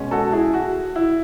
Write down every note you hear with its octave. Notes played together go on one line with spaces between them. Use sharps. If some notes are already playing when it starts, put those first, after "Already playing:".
Already playing: B2 G#3 C#4
F#4 A4
E4 G#4
F#4
E4